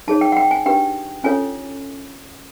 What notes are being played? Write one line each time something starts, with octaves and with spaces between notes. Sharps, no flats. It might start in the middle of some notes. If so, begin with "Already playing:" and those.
D#4 G#4 C#5 A5
G5
F#5
G5
G#5
D4 G4 B4 G5
C#4 F4 A4 C#5 G#5